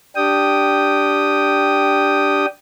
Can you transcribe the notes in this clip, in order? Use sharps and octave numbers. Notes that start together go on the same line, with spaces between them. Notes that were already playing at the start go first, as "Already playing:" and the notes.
D4 G4 G5 D#6